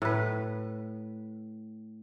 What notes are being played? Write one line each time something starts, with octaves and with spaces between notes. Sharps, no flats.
A2 B4